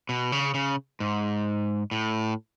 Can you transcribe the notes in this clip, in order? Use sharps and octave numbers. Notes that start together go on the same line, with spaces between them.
B2
C#3
C#3
G#2
A2